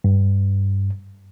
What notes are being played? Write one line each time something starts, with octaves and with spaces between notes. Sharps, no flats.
G2